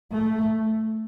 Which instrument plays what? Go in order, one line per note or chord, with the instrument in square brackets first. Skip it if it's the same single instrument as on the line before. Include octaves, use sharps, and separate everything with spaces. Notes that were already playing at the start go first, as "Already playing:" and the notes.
[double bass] A3